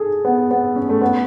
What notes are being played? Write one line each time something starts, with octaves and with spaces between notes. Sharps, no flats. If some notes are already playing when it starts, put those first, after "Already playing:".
Already playing: G#4 A4
B3
B3
C#4
A3
B3